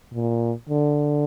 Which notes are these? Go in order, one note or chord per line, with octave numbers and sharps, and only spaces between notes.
A#2
D3